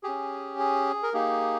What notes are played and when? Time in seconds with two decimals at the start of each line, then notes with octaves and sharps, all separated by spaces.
0.03 C#4 G4 G#4
0.59 G#4
1.03 A#4
1.13 A#3 D#4 G4 G#4